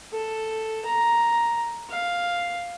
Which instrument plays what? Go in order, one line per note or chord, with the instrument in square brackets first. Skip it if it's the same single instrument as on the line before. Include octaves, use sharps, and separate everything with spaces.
[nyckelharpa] A4
A#5
F5